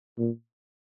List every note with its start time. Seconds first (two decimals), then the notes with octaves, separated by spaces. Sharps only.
0.18 A#2